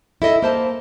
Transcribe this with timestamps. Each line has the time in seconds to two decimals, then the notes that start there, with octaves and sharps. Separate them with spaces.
0.22 E4 A4 D#5
0.42 A#3 C5 A5